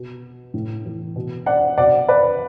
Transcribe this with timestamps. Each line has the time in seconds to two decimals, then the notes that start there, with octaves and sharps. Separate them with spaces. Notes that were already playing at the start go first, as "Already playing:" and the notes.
Already playing: B2
0.54 A2
0.85 E3
1.16 B2
1.46 D5 F#5
1.77 B2 D5 F#5
2.09 B4 D5